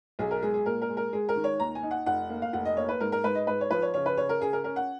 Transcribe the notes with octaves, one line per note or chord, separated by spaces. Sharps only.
B1 G#4
A#4
G#3 G#4
G#4
A#2 A#4
A#4
G#3
A#4
G#3 G#4
A#4
D#3
C#5
D#2 A#5
G#5
D#4
F#5
F1 F#5
A#3
F5
F1 F#5
D#5
A#3 C#5
B4
G#2 A#4
A#4
G#2 B4
D#5
G#2 B4
C#5
F3 B4
C#5
C#3 C#5
B4
C#3 C#5
A#4
C#3 G#4
A#4
C#4 A#4
F#5